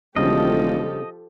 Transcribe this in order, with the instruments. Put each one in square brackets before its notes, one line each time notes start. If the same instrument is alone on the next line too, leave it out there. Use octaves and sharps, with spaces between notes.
[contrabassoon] E1 [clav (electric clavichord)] C#3 G3 D4 [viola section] F3 G4 A4 [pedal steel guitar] D#5